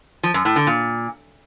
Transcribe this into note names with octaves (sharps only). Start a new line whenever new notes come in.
F3
F#2
A2
D3
A#2